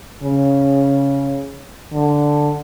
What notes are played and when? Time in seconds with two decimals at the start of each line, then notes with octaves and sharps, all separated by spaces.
0.23 C#3
1.92 D3